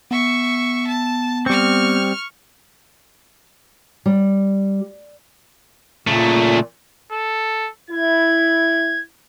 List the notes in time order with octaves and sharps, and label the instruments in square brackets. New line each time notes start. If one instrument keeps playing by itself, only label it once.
[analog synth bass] B3 [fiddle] E5 C#6
[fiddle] A5
[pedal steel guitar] G3 C4 [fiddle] C#6 F6
[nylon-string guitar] G3
[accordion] A#2 [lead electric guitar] C#3 A3
[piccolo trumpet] A4
[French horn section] E4 [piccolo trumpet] G#6